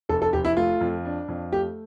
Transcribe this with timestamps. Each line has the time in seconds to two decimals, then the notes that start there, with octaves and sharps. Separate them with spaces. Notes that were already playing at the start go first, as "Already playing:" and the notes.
0.09 F1 A4
0.22 A4
0.33 F1 G4
0.45 E4
0.57 A3 F4
0.81 F2
1.05 D4
1.28 F2
1.52 A3 G4